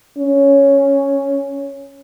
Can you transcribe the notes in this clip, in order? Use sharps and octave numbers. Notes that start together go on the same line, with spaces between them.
C#4